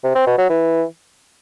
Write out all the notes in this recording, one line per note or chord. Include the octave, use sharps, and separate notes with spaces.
C3
C4
B2
F#3
E3